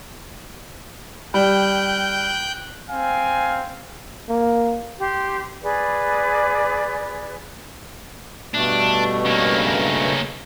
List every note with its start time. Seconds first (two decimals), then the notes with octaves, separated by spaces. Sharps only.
1.34 G3 G5 F#6 G6
2.89 C4 F5 G#5
4.29 A#3
4.99 G4 C6
5.63 G#4 B4 D5
8.54 G2 B2 A3 D4
9.26 C#3 A#3